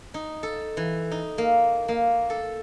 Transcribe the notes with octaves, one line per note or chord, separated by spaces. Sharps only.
D#4
A4
E3
D#4
A#3
A#3
A4